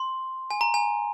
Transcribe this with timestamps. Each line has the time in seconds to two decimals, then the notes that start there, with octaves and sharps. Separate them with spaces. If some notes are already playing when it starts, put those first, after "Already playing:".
Already playing: C6
0.51 G#5
0.61 A#5
0.74 G#5